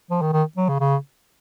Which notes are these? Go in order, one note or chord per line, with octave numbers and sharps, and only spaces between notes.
F3
D#3
D#3
F#3
C#3
C#3